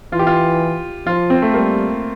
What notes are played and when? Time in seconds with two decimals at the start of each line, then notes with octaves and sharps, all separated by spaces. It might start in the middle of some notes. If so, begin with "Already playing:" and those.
0.12 E3 F4
0.19 G4
0.27 F4
1.06 F3 F4
1.30 C4
1.42 A3
1.54 G3 A#3